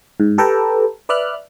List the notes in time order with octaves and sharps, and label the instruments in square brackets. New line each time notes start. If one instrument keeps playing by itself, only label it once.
[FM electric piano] G#2
G4 A4 B4 G5 A5 A#5
B4 D5 E5 F6 F#6